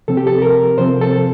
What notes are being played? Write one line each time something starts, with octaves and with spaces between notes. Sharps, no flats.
C3 F3 C4 A4
G4
A4
A#4
C3 F3 C4 C5
A4